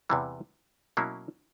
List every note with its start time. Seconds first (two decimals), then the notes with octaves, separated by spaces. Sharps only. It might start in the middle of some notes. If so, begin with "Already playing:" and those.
0.09 E2 C3 E3 G3
0.97 B2 F#3 A#3 C#4 E4